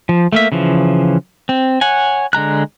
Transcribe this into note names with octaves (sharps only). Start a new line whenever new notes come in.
F3
A3 A#3 E5
C#3 E3 F3
C4
C#5 F#5 G#5
D3 G#3 A#5 F#6